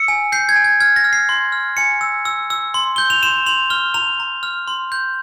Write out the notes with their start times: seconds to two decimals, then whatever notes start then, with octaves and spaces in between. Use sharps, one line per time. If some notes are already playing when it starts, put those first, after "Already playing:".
Already playing: E6 C#7
0.08 G#5
0.32 G6 C7
0.49 G#6
0.56 G#5
0.64 G#6
0.80 F6 G#6
0.96 A#6
1.04 F6
1.13 C7
1.29 C6
1.52 F6
1.77 G#5 C#7
2.01 E6
2.25 E6
2.50 E6
2.74 C6
2.96 G6 G7
3.10 F7
3.23 C6 E7
3.46 C6 F7
3.70 F6 G7
3.94 A#5 F7
4.20 A#5
4.43 F6
4.68 C6
4.92 G6